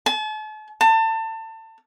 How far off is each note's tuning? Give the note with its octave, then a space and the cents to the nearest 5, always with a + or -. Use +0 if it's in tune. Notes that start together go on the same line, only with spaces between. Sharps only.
A5 -40
A5 +30